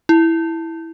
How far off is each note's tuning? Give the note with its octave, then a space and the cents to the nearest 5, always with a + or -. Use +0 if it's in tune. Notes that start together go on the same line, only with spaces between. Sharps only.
E4 -5